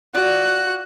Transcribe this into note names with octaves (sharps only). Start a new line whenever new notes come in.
F4 F#4 D5 F#6